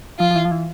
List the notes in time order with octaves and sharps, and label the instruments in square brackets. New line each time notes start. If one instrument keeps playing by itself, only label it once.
[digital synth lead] F3 [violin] F4
[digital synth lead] F3
E3
F3
E3